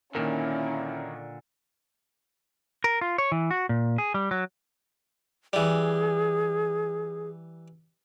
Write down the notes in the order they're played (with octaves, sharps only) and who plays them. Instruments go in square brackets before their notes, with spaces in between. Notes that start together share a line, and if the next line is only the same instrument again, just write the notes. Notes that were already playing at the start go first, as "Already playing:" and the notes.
[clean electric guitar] A#2 D3 [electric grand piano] D#3 A#3 A#4 [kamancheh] C#4 E4
[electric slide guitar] A#4
F4
C#5
E3
F#4
A#2
G#4
G3
F#3
[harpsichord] E3 G3 [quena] G#4